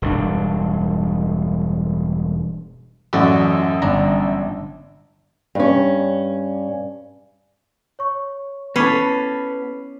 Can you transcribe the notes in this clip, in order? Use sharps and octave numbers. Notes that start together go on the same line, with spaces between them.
E1 G2 D4
A1 F#2 F#4 A4 D5
G1 D4 A#5
G2 C#4
C#5 C#6
B3 C#4 E4 A4 B4 D6 C7